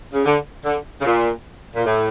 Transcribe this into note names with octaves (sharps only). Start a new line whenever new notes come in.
C#3
D3
D3
C#3
A#2
A#2
A2